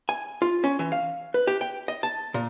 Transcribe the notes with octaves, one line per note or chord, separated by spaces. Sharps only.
G#5
F4
C#4
E3
F5
B4
G4
G5
D#5
A5
A#2